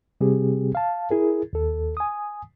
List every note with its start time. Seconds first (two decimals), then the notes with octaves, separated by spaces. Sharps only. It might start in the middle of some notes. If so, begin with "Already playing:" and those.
0.21 C3 G3 C4 G4 G#4
0.75 F5 A5
1.11 E4 G#4 A#4
1.53 D#2 A4
1.97 G#5 D#6